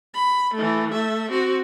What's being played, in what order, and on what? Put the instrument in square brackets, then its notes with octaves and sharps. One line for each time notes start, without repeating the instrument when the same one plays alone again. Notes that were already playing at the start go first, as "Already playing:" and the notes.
[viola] B5
E3 A3
A3 E5
C4 F#4